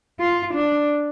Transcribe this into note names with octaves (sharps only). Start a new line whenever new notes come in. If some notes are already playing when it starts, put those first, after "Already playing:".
F4
D4